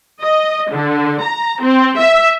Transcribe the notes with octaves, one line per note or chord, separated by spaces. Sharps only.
D#5
D3
A#5
C4
E5